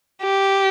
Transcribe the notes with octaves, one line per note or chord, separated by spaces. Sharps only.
G4